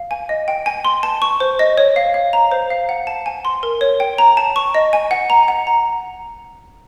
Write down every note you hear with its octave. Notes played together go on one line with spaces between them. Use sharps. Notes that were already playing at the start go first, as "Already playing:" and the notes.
Already playing: F5
G#5
D#5
G5
G#5
C6
A5
C#6
C5
D#5
C#5
F5
F5
A#5
C5
F5
F#5
A5
G#5
C6
A#4
C#5
G5
A#5
A5
C#6
D#5
G#5
F#5
A#5
F#5
A#5